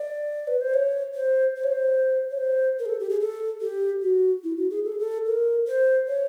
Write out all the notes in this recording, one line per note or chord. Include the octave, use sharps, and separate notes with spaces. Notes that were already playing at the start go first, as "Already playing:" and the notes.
Already playing: D5
B4
C5
C#5
C5
C5
C#5
C5
C#5
C5
A#4
G#4
A4
G4
G#4
A4
G4
F#4
E4
F#4
G#4
A4
G#4
A4
A#4
C5
C#5